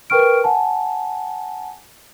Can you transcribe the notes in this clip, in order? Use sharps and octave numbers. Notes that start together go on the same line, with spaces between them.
A#4 B4 G5 C#6 F6 D7
F#5 G#5 A5